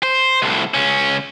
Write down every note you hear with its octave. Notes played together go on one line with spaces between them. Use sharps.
C5
C2 A2
C#2 C#4